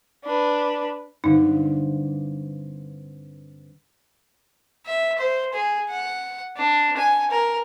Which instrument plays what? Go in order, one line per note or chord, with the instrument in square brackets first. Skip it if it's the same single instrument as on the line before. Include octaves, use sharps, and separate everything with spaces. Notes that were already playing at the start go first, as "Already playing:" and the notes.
[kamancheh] D4 B4
[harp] G2 D3 C4 [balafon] D#4
[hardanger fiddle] E5
C5
G#4
F#5
D4
G#5
A#4